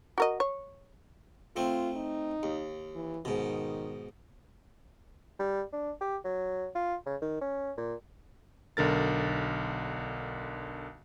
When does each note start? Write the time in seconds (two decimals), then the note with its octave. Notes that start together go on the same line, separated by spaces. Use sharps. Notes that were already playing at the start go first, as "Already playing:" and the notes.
0.18 F#4 A#4 D#5
0.40 C#5
1.56 A3 C4 F4
1.97 D#4
2.43 D#2
2.95 E3
3.25 G#2 B2 D#3
5.39 G3
5.73 D4
6.01 G4
6.25 F#3
6.75 F4
7.06 C#3
7.22 D#3
7.41 C#4
7.77 A#2
8.77 B1 D3 A#4 A6